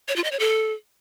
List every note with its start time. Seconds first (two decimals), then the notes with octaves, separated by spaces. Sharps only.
0.08 C#5
0.16 F4
0.24 D#5
0.32 C#5
0.39 A4